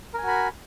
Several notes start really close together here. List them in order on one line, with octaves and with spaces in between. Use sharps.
A#4 G#5 F#4 B5